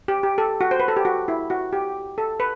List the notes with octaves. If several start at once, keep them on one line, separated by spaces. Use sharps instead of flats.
G4
G4
A4
F#4
C5
B4
A4
G4
F#4
E4
F#4
G4
A4
B4